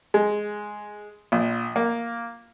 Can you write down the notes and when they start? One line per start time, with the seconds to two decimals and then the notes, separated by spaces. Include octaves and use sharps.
0.14 G#3
1.32 A#1
1.76 A#3